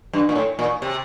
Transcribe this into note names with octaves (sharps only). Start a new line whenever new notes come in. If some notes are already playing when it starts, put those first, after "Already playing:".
G2
A#2
A2
A#2
C3